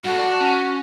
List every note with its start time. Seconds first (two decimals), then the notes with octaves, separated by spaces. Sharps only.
0.04 G2 F#4 A4
0.18 D5 A5
0.40 C#4